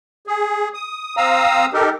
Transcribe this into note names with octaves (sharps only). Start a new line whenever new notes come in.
G#4
D#6
C4 F5 A#5 D#6 E6
D#4 G4 A4 A#4